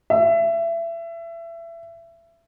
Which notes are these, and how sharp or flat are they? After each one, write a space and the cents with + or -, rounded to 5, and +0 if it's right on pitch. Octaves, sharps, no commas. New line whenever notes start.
E5 +25